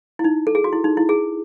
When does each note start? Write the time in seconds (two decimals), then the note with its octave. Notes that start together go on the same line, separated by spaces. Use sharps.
0.19 E4
0.24 D#4
0.47 A4
0.55 G#4
0.64 F#4
0.73 E4
0.84 D#4
0.97 E4
1.09 G#4